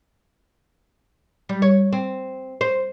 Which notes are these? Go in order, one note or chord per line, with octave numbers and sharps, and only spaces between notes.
G3
C#5
C4
C5